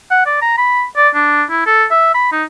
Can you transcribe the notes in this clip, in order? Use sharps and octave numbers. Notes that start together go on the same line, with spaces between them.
F#5
D5
A#5
B5
D5
D4
E4
A4
E5
B5
D#4